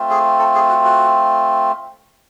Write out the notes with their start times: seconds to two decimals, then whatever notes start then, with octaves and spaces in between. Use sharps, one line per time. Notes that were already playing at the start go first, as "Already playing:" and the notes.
Already playing: A3 C4 F4
0.10 G#4
0.39 A4
0.55 G#4
0.69 F#4
0.85 F#4